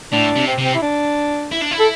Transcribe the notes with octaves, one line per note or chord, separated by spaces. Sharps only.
A2 D4
C3
C4
C3
C4
E4
D4
E4
D4
E4
A4